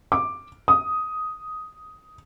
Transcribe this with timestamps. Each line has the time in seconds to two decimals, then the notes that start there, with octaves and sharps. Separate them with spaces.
0.12 D6
0.68 D#6